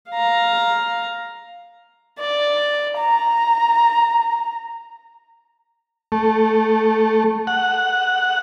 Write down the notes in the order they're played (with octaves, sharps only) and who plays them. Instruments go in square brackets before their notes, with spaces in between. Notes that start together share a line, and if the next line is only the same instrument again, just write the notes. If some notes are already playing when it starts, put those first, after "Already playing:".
[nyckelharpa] F5 A#5
[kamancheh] D5
A#5
[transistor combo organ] A3
F#5